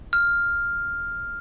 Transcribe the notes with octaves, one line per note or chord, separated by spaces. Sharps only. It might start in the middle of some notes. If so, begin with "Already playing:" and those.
F6